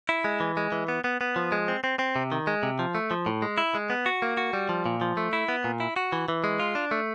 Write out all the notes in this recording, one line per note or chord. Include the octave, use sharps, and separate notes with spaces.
E4
G#3
E3
G#3
E3
B3
B3
B3
F3
G#3
C4
C4
C4
C3
D#3
G#3
C3
F3
A3
F3
A2
G#3
E4
G#3
B3
F#4
A#3
F#4
G3
F3
A#2
F3
A3
E4
B3
A#2
E4
F#4
E3
E3
G#3
F4
D4
A3